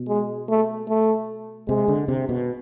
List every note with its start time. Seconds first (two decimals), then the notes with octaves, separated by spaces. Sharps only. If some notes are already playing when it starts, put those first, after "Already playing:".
Already playing: B2
0.08 G#3
0.49 A3
0.89 A3
1.68 C3 G#3
1.88 D3
2.08 C3
2.29 B2